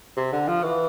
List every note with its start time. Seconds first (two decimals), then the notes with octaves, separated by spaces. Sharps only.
0.17 C3
0.32 D3
0.48 F3
0.63 E3